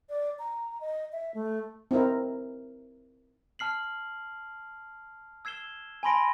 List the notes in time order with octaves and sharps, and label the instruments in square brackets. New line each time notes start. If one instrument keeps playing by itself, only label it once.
[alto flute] D5
A#5
D#5
E5
A3
[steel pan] C4 D#4 E4 A#4
[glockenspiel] A5 F6 C7 F#7
E6 G#6 C7 E7 G7
G#5 A5 B5 C6 A#6 D7